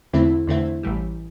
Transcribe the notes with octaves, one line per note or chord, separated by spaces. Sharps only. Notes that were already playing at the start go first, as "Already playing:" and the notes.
E2 D3 A3 C4 E4
E2 D3 A3 C4 E4
A1 A2 E3 G3